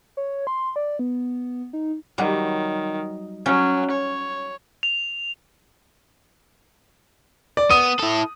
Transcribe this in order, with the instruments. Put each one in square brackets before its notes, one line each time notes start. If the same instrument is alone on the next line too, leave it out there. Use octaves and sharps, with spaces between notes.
[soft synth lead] C#5
C6
D5
B3
D#4
[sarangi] D#3 [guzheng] F#3 G3
[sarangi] F#3 [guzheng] C#4
[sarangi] C#5
[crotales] F7
[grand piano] D5
[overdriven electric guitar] B3 [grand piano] D#6 D#7
[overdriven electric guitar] E4 A4